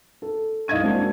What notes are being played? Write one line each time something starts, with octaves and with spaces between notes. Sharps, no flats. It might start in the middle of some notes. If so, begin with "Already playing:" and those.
A4
C2 D#5 F5 G#6 D#7
G#3 A#3 C4 D4 F#4